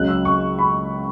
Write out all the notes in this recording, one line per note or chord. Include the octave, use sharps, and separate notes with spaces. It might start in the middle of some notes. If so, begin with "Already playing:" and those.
Already playing: C#2 C#3 F#3 F#6
E6
C#6
B5